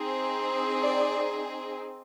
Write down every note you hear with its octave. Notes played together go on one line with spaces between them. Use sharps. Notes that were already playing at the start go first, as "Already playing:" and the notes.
Already playing: C4 D#4 G#4
D5